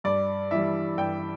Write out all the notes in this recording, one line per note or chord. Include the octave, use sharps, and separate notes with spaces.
G2 D5
E3 G3 E5
G2 G5